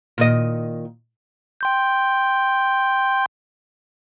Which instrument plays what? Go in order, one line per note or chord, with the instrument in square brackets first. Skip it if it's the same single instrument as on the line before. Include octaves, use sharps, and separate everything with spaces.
[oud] A#2 D#3 D#5
[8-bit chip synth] G5 C6 G6